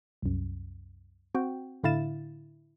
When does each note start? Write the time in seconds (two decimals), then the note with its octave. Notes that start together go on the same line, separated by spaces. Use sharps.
0.22 C2 F#2
1.35 C4 F#4 G5
1.83 A2 D3 E4 F5 A6 E7